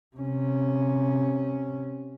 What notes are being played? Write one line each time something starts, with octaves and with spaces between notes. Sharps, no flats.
C3 C#4